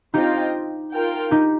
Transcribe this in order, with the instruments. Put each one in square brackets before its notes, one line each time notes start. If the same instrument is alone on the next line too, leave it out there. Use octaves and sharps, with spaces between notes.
[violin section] C4 F4 D#5 G5 [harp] D#4 G4
[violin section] F4 A#4 G5
[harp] D#4 G4